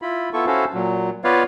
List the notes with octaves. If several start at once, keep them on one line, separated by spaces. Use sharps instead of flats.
E4 F4 B5
B3 E4 F4 A4 C#6
C#4 E4 F#4 A4 C5 F5
A#2 F#3
B3 F4 B4 C#5 D5 F5